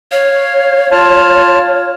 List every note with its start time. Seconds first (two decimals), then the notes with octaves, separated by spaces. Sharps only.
0.12 C#5 F5
0.92 F4 A5 F6